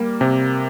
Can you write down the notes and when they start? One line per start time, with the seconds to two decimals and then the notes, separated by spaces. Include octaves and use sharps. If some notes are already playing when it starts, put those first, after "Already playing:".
Already playing: G3 A#3
0.21 C3